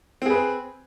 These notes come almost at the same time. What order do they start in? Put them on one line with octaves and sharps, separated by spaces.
C4 G#4 B4